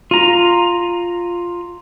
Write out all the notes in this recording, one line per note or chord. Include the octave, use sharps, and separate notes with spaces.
F4 A#5